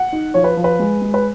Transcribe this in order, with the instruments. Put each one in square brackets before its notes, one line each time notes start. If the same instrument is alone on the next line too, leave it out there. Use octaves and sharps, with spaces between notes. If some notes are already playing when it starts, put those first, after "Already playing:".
Already playing: [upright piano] F#5
D#4
F3 C#5
B4
F3
B4
G#3
G#3
B4